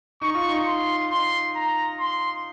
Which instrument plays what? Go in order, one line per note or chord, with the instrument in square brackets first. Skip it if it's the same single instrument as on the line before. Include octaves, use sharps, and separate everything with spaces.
[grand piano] D#4 [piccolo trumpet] C#6
[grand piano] F4
D#4
[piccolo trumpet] C6
[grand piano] D#4 [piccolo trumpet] C6
[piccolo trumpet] A#5
C6